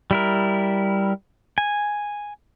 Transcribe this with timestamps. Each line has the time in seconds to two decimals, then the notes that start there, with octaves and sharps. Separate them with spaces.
0.11 G3 E4 A#4
1.58 G#5